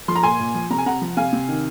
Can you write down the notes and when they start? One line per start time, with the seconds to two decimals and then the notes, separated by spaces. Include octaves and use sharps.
0.08 F3 C6
0.15 A#5
0.23 A#2 G#5 C6
0.39 A#2
0.55 F3
0.70 C3 A#5
0.78 G#5
0.86 C3 F#5 A#5
1.01 F3
1.17 C3 F5 G#5
1.33 C3
1.48 D#3